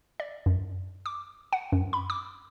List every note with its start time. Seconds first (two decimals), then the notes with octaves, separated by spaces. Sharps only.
0.20 D5
0.46 F#2
1.06 D6
1.53 F#5
1.72 F#2
1.93 B5
2.10 D6